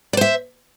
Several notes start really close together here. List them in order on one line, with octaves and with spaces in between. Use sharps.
D5 C5 E5